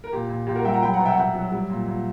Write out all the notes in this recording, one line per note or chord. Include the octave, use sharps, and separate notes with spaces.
A#4
A#2 G4
A#2
A#2 G4
F#4 A#4
G3 E5 G5
F#5 A#5
F#3 G5 B5
F#5 A#5
B2
E5 G5
F#5
B2 E5 G5
F#3
G3
A#2
A#2